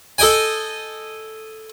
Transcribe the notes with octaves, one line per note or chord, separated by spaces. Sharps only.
A4 D#5 G5 G#5